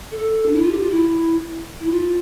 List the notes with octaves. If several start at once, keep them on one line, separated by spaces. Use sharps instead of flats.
A4
D4
E4
F4
G4
F4
E4
E4
F4